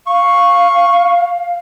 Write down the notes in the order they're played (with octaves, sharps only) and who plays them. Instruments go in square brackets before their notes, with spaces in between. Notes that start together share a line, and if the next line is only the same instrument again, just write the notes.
[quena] F5 [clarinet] C#6